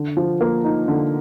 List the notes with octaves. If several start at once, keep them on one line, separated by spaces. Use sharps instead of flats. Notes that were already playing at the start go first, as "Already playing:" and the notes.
Already playing: D3
F3
A#3
D#4
D3